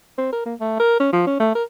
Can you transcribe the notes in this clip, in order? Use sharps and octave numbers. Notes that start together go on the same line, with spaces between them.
C4
A#4
A#3
A3
A#4
C#4
F3
C#4
A3
A#4